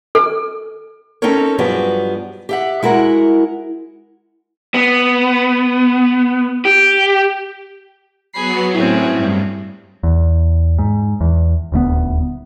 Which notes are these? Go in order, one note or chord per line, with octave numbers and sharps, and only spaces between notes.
A4
C4 C#4 D#4 A4 A#4 C#5
G2 F3 F#3 B3 G4 G#4
G4 E5 F#5
G#3 E4 F#4 A#4 F#5
B3
G4
F#3 B3 G#4 B5 C7
A2 C4 C#4 E4 G#4
G2
E2
G#2
E2
D#1 D2 A3 B3